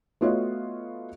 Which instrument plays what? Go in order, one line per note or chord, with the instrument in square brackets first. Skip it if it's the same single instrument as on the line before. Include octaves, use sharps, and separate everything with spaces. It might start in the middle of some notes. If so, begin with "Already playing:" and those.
[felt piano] A3 B3 F4 F#4 C#5 D#5